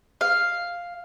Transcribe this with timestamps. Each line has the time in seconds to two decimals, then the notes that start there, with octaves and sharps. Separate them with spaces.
0.21 F5